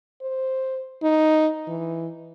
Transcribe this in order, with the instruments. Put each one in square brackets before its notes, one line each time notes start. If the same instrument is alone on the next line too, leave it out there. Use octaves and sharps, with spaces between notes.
[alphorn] C5
D#4
E3